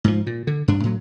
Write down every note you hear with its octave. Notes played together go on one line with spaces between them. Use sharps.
G#2 F3
A#2
D3
G2 D4
A2 F#3